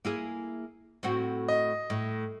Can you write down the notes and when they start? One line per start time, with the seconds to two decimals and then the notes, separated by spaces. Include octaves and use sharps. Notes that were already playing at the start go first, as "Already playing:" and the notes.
0.05 A#3 E4 G#4
1.03 A2 C4 F#4
1.48 D#5
1.90 A2